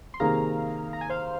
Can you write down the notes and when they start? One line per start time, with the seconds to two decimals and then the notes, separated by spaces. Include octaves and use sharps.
0.14 C6
0.20 C3 D#3 A#3 G#4 F5 A#5
0.93 A#5
1.01 G#5
1.10 C5 F5